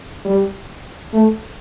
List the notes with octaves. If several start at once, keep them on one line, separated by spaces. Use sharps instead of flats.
G3
A3